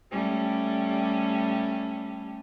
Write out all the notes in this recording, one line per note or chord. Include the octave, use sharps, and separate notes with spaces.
G3 A3 C#4